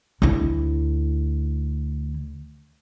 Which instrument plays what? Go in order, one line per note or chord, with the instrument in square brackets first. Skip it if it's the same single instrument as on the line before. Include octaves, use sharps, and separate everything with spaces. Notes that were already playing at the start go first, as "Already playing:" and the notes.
[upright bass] D2 E4